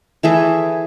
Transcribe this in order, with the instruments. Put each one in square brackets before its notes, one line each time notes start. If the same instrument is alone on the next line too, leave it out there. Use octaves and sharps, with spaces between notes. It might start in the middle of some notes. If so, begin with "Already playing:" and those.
[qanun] E3 A3 G#4 E5